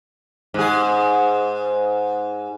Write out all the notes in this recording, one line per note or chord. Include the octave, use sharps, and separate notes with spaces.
G#2 G#4